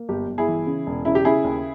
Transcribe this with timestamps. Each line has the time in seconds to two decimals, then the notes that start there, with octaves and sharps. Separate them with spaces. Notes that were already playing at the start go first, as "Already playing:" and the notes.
Already playing: A#3
0.09 G1 G4
0.27 G1
0.38 E4 G#4
0.47 E3
0.67 C#3
0.87 E1
1.05 C#3 E4
1.15 G4
1.25 C#3 E4 G#4
1.44 D#2